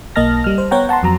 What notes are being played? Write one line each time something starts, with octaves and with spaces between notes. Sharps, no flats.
B1 A#3 D#5 A5 F6 A#6
G3 F6
C5
B3 C#5 F#5 G5 A#5
F#5 A5 A#5 C6
F2 F#3 A#5